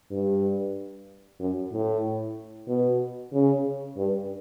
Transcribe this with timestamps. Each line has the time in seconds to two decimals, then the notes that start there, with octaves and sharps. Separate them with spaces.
0.11 G2
1.39 F#2
1.72 A2
2.68 B2
3.33 C#3
3.97 G2